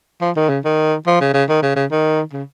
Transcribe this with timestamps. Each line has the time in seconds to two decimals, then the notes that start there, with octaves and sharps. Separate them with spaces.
0.21 F3
0.36 D#3
0.50 C#3
0.65 D#3
1.07 F3
1.21 C#3
1.34 C#3
1.49 D#3
1.63 C#3
1.76 C#3
1.91 D#3
2.33 C#3